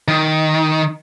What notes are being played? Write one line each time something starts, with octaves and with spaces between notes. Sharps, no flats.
D#3